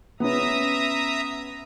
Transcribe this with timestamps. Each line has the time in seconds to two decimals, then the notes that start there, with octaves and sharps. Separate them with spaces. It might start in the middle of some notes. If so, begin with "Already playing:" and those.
0.20 B3 C#4 E5 A#5 D#6